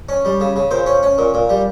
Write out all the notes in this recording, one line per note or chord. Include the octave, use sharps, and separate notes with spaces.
C#4
G3
C#3
C#3
A#2 C5
C#4
C#4
A#2
A#2
G3